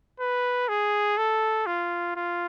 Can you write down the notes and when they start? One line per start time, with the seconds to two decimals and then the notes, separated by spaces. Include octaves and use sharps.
0.20 B4
0.68 G#4
1.17 A4
1.66 F4
2.16 F4